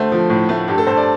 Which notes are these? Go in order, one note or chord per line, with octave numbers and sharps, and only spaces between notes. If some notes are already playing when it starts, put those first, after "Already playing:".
Already playing: D2 A3 C5
F3
A2
A3
G2 G4
A4
G2 C5
D5